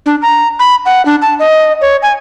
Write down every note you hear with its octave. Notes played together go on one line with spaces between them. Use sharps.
D4
A#5
B5
F#5
D4
A5
D#5
C#5
G#5